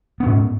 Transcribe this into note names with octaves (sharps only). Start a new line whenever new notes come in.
G#2 B3 C#4